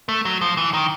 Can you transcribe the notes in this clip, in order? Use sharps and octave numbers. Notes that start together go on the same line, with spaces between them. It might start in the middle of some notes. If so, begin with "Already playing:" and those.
A3
F#3
F3
E3
D#3